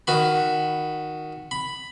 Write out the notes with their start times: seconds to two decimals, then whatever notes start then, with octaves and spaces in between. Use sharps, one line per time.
0.07 D#3 F#4 B5
1.51 B5